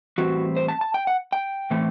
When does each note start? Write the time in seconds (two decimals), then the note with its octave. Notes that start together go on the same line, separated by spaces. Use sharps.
0.18 A2 E3 G3 C4 F#4
0.56 C5
0.68 A5
0.81 A5
0.94 G5
1.07 F#5
1.33 G5
1.70 A2 E3 A3 C4